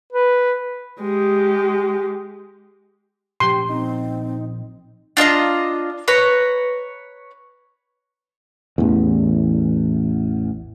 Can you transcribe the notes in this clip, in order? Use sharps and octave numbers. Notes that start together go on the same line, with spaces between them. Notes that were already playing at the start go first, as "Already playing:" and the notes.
B4
G#3 G4
A#2 F3 C#4 G4 C6
C4 D#4
D4 F4 D#5 A#5
B4 C#5 A#5
A1 E2